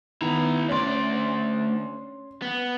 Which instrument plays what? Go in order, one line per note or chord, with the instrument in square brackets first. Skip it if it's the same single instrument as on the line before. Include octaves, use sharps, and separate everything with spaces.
[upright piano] D#3 B3 [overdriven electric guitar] E4 A#5
[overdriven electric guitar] D2 D5 [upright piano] C#4 C6
[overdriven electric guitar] B3